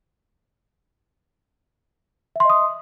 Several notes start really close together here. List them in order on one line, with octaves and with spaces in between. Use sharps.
E5 C6 D#5 D#6